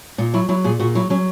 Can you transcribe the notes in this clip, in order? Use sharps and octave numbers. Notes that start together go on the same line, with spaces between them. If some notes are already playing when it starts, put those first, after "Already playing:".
A#2 D#4
F#3 E4
F#3 E4
A#2 G#4
A#2 F#4
F#3 E4
F#3 C#4